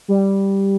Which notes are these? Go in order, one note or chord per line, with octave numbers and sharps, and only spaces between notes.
G3